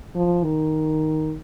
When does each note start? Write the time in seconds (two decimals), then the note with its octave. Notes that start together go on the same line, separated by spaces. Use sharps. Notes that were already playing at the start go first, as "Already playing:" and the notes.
0.15 F3
0.44 D#3